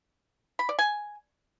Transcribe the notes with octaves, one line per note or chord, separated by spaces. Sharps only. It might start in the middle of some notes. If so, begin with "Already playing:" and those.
B5
D5
G#5